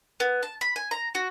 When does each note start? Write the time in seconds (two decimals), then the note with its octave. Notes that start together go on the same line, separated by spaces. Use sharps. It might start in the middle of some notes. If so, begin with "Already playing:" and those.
0.20 B3
0.43 A5
0.61 B5
0.76 G#5
0.91 A#5
1.15 F#4